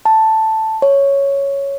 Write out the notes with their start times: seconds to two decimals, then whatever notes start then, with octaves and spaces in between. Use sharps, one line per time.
0.05 A5
0.82 C#5